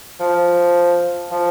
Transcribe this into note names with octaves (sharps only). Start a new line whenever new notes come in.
F3
F3